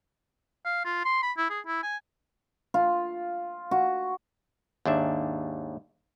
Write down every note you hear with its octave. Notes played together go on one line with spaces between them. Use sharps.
F5
F4
C6
B5
E4
G#4
E4
G#5
F4
F#4
D#2 G#2 D4 E5